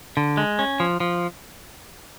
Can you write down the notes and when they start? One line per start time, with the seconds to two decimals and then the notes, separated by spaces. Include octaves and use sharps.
0.17 D3
0.37 G#3
0.59 C#4
0.80 F3
1.00 F3